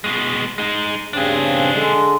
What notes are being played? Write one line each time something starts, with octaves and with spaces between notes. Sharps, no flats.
B2 G#3
G#3 D#4
G2 C#3 C4 D4 G#4
D3 G#3